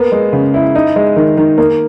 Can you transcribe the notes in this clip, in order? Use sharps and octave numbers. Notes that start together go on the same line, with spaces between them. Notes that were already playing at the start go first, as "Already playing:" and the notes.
Already playing: A#3 B3
G#3
C#3
E4
D#4
G#3
D#3
D#3
A#3